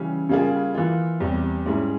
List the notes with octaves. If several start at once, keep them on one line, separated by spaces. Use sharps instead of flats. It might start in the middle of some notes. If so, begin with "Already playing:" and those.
Already playing: C#3 E3 G3 C#4 G4
C#3 G3 A#3 F4 G#4
E3 A#3 F4
E2 C3 G3
G#2 G3 C#4 E4 G#4